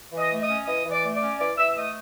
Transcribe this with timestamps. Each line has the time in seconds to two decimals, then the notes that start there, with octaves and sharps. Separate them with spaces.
0.12 E3
0.17 D#5 D#6
0.30 A3
0.42 D#5 D#6
0.48 C#4
0.66 E3 D#5 D#6
0.85 E3
0.91 D5 D6
1.03 A3
1.15 D5 D6
1.21 C#4
1.39 E3 D5 D6
1.58 E3 E5 E6
1.71 E6
1.76 A3 D#5 D#6